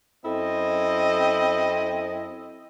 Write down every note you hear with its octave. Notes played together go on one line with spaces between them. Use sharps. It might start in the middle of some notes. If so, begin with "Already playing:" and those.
F#2 C4 E4 A4 D#5